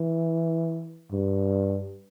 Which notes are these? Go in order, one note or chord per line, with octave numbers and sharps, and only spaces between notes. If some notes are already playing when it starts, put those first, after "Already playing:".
Already playing: E3
G2